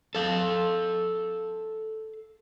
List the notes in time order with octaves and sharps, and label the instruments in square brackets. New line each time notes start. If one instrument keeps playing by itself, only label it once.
[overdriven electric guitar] A4 F5